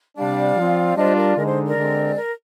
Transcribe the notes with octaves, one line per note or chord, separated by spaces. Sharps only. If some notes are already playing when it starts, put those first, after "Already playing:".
C3 G3 D4 D5 F5
F3 C4 F4
G3 D4 F4 C5 D#5
A#4 D5
D3 G#3 D#4 A#4
C5
A#4 D5
D3 G#3 C4
A#4